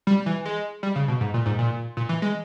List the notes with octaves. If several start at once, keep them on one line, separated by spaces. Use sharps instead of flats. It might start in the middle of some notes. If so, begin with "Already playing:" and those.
G3
E3
G#3
G3
C#3
B2
G#2
A#2
G#2
A#2
A#2
E3
G#3